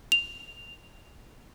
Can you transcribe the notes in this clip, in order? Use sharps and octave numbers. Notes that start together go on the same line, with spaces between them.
F7